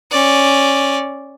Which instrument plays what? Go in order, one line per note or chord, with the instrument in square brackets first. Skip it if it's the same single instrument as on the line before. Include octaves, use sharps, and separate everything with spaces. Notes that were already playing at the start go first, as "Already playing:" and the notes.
[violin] C#4 D5